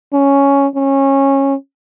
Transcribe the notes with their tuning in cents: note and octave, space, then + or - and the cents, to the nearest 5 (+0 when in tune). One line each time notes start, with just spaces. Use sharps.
C#4 +5
C#4 -20